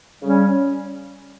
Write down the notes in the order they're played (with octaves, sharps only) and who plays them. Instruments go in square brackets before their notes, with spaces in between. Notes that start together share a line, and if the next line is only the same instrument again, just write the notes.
[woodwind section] C#3 G3 C#4